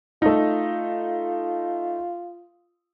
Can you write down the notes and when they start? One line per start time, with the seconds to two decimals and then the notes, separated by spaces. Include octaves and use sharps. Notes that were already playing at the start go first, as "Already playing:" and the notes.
0.22 A3 D#4 F4